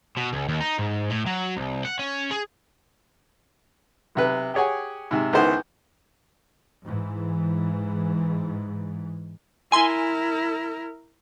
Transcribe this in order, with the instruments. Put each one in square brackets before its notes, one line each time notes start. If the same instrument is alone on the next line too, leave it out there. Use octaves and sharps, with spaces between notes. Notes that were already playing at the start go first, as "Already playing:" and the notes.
[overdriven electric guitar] B2
C#2
D#2
D#4
G#2
A2
F#3
C2
F#5
C#4
G#4
[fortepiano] B1 C3 B4
G4 G#4 C#5 F#5 G#5
G#2 C3
C#2 D#3 B3 E4 C5 F#5
[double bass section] G#2 E3
[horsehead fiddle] E4 A#4 [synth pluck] G#5 C6